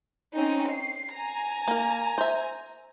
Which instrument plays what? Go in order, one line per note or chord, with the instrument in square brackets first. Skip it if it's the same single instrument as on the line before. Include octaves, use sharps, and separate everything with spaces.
[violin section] C4 C#4 D#4
C7
G#5 A#5
[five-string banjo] A#3 A#4
C5 E5